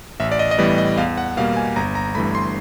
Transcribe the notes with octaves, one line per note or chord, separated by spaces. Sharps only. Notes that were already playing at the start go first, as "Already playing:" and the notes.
A1 E5
D5
D#5
D#5
A2 E3 G3 B3 D5
D#5
E2 F5
F#5
B2 G3 A#3 F5
G#5
G1 A#5
A#5
G2 E3 A3 B5
C6